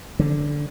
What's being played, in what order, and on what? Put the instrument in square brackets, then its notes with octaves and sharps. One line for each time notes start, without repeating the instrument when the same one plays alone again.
[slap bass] D3